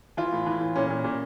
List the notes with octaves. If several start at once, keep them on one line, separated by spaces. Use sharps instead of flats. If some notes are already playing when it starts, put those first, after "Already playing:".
E3 F4
A2
E3
A2
A#2 C#4
A#2
A#2